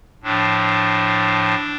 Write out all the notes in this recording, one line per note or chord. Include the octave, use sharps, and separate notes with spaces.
A2 F3 D4